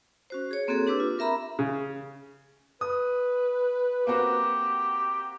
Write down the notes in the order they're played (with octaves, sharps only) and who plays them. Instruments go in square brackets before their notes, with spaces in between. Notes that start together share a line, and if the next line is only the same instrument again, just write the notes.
[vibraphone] C#4 F#4 C5
G#4 C#5
A#3 C4 F#4 G#4 A4
D4 G4 B4 D6 E6
F4
C4 A#4 E5 A#5 B5
[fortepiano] C#3
[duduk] B4 [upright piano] D#6
[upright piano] A#3 C4 F#4 [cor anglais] G4